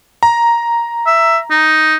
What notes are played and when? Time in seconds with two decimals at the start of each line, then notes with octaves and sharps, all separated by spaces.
0.23 A#5
1.06 E5
1.50 D#4